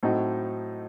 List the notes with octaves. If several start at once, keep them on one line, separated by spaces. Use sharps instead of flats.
A2 F#3 A3 C4 D#4